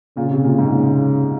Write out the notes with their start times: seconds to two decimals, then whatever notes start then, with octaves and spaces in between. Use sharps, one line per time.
0.16 A#2 C#3
0.31 C3
0.44 A#2
0.59 G#2
0.71 A#2 C#3